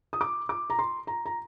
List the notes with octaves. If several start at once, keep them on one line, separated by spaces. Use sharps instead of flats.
D#6
D6
D6
A#5
C6
A#5
A#5